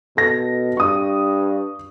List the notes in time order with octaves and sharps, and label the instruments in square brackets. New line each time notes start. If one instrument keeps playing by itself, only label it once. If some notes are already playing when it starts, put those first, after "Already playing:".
[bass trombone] B2 [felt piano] A4 A#6
[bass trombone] G2 [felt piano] C#6 D#6